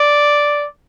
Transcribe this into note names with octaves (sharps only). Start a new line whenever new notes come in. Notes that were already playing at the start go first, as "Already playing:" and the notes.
Already playing: D5